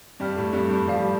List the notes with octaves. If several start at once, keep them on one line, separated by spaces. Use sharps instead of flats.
G2 G3 D5 G5 F6
A2 A3
G2 G3
G2 G3
F3 G4 D5 F5
G3